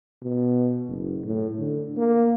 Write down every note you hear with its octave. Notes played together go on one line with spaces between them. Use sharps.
B2
F#1
A2
D3
A#3